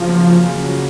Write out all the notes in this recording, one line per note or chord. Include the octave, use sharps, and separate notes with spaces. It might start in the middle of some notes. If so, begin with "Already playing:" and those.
Already playing: C#3 F3 F#3
A#3
F4
C#3
F#3